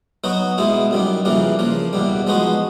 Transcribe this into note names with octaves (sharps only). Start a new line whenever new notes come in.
F#3 B3 D#4 F#4
B2 G#3 B3 E4
F#2 D#3 G3
F2 C#3 E3 G3 A#3
C#3 F3 A#3
E2 B2 G3
F3 G#3 B3 D#4 F#4